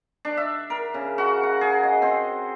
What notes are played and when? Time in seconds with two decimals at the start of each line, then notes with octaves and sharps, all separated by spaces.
0.25 D4
0.37 E5
0.70 A#4
0.94 C#3
1.18 F#4
1.43 F#5
1.61 G#4
1.83 D#5
2.02 C4